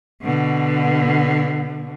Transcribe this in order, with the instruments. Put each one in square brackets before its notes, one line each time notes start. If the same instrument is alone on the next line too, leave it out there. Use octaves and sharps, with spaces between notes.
[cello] B2 D3